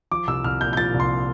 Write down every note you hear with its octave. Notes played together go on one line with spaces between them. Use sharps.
F3 D6
C2 E6
C2 F6
A#2 G6
G6
F3 A6
C2
C6